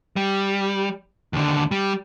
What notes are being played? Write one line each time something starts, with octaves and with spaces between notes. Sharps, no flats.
G3
D#2 D3
G3